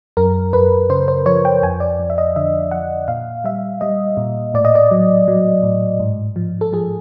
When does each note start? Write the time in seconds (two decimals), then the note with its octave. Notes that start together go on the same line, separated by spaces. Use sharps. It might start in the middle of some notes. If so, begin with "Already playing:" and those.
0.17 F#2 A#4
0.53 F#2 B4
0.89 C#3 C5
1.08 C5
1.26 F3 C#5
1.45 G5
1.62 F2 G#5
1.80 D5
2.00 F2
2.10 E5
2.18 D#5
2.36 D3 E5
2.71 F3 F#5
3.08 A#2 F5
3.44 G3 E5
3.81 G3 D#5
4.17 A#2
4.54 A2 D5
4.65 D#5
4.75 D5
4.91 F#3
5.28 F#3
5.63 A2
6.00 G#2
6.36 F3
6.61 A4
6.73 F3 G#4